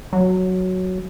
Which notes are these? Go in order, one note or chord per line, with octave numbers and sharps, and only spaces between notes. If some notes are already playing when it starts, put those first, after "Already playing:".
F#3